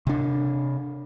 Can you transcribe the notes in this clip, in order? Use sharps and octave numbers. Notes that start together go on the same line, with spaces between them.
C3 D4